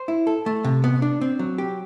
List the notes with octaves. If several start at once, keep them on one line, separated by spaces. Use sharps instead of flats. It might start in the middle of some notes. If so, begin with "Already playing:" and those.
Already playing: C5
E4
A4
A3
C3
B3
D4
C4
F#3
G4